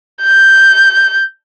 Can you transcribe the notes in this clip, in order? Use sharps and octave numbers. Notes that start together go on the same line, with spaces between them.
G6